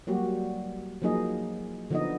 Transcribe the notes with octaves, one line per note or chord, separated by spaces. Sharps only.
F#3 G3 A#3 F#4 G4
F3 F#3 A#3 D#4 G#4 D#5
D3 F3 B3 D#4 D#5